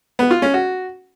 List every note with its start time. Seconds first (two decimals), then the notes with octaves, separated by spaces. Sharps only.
0.19 B3
0.31 F4
0.42 C#4
0.54 F#4